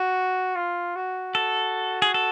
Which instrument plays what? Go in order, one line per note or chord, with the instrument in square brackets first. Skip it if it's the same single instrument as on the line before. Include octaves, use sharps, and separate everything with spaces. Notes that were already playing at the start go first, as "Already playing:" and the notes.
Already playing: [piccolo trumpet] F#4
F4
F#4
[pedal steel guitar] A4
G#4
A4